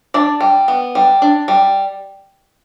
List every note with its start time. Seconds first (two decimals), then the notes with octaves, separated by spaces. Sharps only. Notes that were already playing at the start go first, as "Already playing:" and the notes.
0.14 D4 D5
0.41 G3
0.68 B3
0.95 G3
1.22 D4
1.48 G3